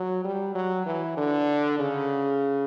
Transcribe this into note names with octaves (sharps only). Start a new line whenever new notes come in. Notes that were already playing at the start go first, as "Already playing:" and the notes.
Already playing: F#3
G3
F#3
E3
D3
C#3